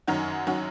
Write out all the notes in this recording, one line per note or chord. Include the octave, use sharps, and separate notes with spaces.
F#2 D#3 F#3 C#4 F#4
D#3 F#3 C#4 F#4